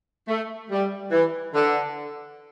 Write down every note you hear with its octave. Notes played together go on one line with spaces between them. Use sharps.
A3
G3
E3
D3